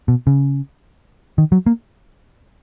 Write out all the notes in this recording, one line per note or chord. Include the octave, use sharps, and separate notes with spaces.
B2
C#3
D#3
F#3
A#3